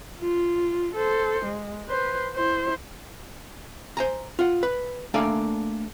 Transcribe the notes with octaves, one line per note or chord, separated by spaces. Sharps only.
F4
A4 C5
G#3
B4 C5
E4 C5
C5 G#5 A#5
F4 F#5
B4
A3 A#3 D4 D5 F5 G#5